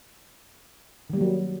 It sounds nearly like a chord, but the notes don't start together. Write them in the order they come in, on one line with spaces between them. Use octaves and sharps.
D#3 G3 A#3 F#3